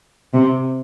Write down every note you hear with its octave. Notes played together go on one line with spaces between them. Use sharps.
C3